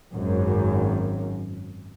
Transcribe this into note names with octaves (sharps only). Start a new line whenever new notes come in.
G#1 F#2